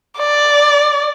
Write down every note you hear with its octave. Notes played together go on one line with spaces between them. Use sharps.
D5